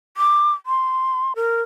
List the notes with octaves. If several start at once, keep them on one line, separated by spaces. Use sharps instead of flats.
D6
C6
A#4